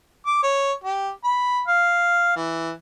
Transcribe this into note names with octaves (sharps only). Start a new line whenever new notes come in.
D6
C#5
G4
B5
F5
E3